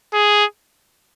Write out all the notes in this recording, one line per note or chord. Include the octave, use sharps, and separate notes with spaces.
G#4